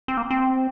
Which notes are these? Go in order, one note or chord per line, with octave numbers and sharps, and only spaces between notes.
C4
A#3
C4